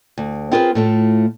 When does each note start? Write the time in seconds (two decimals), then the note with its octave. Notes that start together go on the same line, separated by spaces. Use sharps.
0.18 D2
0.51 C4 E4 F4 G#4 A#4 B4
0.75 A2 A3 F4